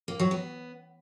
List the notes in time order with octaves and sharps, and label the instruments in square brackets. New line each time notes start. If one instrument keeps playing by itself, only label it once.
[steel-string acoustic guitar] A#3
F#3
B3